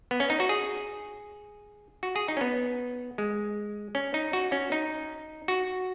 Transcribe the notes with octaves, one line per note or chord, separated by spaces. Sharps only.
B3
C#4
D#4
F#4
G#4
F#4
G#4
D#4
C#4
B3
G#3
C#4
D#4
F#4
C#4
D#4
F#4